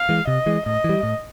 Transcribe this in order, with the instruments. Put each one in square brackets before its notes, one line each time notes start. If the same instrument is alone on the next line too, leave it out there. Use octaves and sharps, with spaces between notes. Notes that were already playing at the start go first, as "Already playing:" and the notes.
Already playing: [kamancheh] F5
[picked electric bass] E3 G#3
[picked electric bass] C3 [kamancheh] D#5
[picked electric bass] E3 G#3
[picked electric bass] A2 [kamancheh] D#5
[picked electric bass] E3
G3
A2